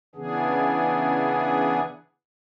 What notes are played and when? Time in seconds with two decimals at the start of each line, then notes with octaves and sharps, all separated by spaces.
0.15 C#3 E3 B3 D4 G#4